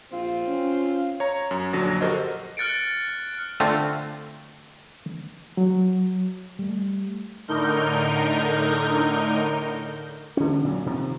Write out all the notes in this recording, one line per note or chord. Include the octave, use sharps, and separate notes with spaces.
A#1 C4 F4
C#4
C#5 A#5
F#2
A#1 F#2 D3 F#3 A#6
F#4 G4 A4 A#4 C5 D#5
F6 F#6 A6 C#7 D7
D3 A3 C4 F4
F#3
G3 A3
A2 D3 D#4 A#4 G6
D3 C#4
A#2 F#3
C3 D#3 F3